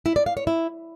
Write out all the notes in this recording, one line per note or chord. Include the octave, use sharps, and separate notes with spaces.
E4
D5
F5
C#5
E4